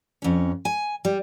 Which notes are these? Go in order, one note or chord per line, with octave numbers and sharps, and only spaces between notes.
F2 C#4
G#5
G3